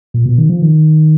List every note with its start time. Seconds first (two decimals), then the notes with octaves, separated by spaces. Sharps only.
0.14 A#2
0.26 B2
0.38 D#3
0.49 F3
0.62 D#3